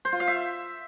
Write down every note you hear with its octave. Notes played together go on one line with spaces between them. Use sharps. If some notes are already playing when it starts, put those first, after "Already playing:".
C5
F4
F5
E5